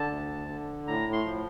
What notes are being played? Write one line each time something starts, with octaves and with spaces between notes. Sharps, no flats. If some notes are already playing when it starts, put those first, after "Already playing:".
Already playing: D3 A5
D2
D3
A2 A#5
C6
F3